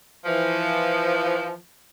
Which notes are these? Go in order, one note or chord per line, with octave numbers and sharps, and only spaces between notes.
E3 F3